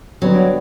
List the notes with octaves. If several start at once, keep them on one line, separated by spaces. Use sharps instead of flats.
D3 F#3 G3 B3